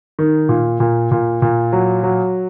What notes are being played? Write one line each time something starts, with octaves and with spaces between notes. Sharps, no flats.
D#3
A#2
A#2
A#2
A#2
F#3
F#3